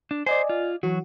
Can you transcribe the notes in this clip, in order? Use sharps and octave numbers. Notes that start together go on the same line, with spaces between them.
D4
C5 D5 D#5 G#5
F4
E3 F#3 F#4